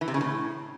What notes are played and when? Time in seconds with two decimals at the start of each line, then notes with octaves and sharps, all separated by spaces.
0.01 E3
0.08 C3
0.14 C#3
0.21 A2